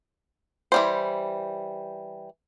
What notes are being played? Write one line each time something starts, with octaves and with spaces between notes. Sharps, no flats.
E3 G3 C5